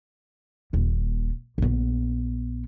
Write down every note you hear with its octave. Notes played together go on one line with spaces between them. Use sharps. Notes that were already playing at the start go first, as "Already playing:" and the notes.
D#1 D#2
A#1 B3